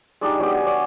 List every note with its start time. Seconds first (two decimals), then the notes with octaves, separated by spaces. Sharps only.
0.21 G#3 D4 D#4 G4
0.39 F#3 B3 G4 D5
0.51 B3 G#5
0.64 D4 C#5 D5